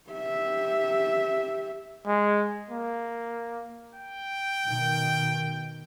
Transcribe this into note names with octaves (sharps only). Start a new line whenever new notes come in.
G4 E5
G#3
A#3
G5
B2 D#3